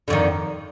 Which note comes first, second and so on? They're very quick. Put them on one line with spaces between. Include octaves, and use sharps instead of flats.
D3 F2 D#3